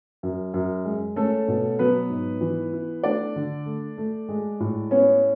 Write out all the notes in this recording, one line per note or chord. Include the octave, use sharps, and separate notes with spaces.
F#2
F#2
G#3
A3 C#4 A4
B2
F#3 B3 B4
G#2
E3
E4
A3 D4 D5
D3
A3
A3
G#3
A2
B3 C#4 C#5